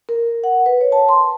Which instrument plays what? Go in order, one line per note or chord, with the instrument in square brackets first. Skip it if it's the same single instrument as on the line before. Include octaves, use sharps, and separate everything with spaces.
[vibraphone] A#4
F#5
B4
C#5
A5
C6